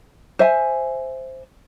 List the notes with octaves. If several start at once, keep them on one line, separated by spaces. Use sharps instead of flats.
C5 E5 G#5